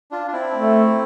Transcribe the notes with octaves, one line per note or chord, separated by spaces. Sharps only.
D4 F4
D4
C4 E4
A3